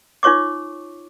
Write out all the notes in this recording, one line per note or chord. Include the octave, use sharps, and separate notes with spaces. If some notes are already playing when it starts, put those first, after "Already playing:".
D#4 F4 C#5 C#6 D6